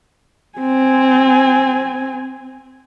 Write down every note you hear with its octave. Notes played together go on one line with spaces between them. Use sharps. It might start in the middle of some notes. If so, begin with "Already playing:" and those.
C4 G#5